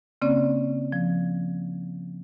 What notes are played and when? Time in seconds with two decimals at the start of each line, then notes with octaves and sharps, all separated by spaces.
0.22 C#3 A#3 C4 C#4 D5
0.92 F3